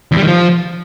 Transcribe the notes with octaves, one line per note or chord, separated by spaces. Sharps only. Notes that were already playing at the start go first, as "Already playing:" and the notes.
E2
G3
D#3
F3